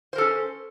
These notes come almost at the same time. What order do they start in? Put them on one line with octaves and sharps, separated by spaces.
C5 A#4 A4 C#4